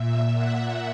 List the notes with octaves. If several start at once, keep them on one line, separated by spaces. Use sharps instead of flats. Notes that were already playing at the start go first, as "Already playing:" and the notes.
Already playing: A#2 E5
F#5